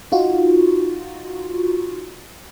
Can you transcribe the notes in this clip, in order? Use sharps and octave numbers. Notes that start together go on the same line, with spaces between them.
D#4 F4 F#4